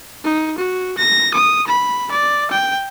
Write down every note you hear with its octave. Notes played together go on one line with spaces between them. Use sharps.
D#4
F#4
A#6
D#6
B5
D5
G5